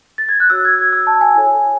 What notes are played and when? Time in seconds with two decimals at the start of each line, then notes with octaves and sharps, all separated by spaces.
0.18 A6
0.29 G#6
0.40 F#6
0.50 F#4 C#5 E6
0.65 G#6
0.79 G#6
0.93 E6
1.07 A5
1.21 G#5
1.35 E4 A4 C#5